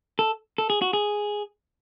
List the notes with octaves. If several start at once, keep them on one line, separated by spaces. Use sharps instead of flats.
A4
A4
G#4
F#4
G#4